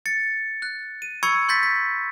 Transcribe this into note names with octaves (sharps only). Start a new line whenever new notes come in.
A6 C#7
F#6
D#7
B5 C#6 E6 G#6 C#7
C6 G6 A6 B6
B6